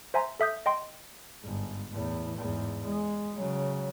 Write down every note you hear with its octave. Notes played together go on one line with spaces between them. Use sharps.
C5 E5 G#5 A#5 C6
A4 E5 D#6 G6
D#5 G5 C6
G1 G#2
E2 A2
E2 G#2
G#3
C#3 F#3